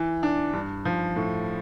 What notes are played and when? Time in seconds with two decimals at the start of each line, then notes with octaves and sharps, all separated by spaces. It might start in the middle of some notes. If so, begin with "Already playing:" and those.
Already playing: E3
0.23 D4
0.53 G2
0.85 F3
1.16 A2